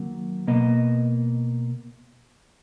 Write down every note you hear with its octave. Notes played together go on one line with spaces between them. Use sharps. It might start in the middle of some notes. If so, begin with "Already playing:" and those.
Already playing: D#3 F#3 A#3
B2 A#3 D#5